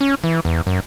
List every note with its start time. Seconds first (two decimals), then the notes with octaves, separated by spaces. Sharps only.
0.01 C#4
0.24 E3
0.45 E2
0.67 F#2